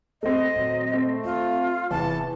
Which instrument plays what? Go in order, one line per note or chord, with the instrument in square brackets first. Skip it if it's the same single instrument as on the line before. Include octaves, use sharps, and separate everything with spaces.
[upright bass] E2 [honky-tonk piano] A3 C4 [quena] D#5
[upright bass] A#2 D#3 [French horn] F#3
[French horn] A3 [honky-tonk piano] C4
[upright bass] D#2 [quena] F4
[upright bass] D1 C3 [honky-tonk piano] E2 [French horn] E3 [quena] A5